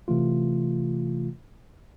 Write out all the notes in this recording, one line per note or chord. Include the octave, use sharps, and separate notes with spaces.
C3 E3 A3 F4